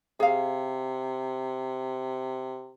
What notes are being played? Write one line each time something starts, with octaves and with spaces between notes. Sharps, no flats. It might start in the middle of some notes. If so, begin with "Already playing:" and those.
C3 G#4 F5